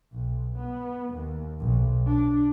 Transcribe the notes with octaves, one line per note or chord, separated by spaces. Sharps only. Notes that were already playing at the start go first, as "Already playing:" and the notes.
B1
B3
D#2
B1
D4